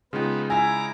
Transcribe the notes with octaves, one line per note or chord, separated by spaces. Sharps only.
C#3 G#3 B3 D#4 F4 G5
E4 E5 G#5 A#5 D6